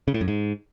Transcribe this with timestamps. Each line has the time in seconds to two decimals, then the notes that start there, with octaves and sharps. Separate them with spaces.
0.08 C#3
0.14 A2
0.21 F#2
0.28 G#2